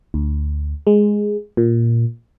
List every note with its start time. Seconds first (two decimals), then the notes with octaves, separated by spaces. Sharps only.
0.14 D2
0.87 G#3
1.57 A#2